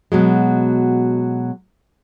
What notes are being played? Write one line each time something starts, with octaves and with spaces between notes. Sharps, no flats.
B2 F#3 G#3